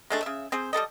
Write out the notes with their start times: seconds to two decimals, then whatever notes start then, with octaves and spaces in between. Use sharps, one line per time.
0.10 G#3 A3 D4
0.23 C#3 E5
0.52 C4 G#4 C5
0.73 G3 C4 A4 D#5